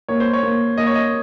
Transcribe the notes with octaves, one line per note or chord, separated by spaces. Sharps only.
A#3 C#5
C5
C#5
A#3
A#3 D#5
C#5
D#5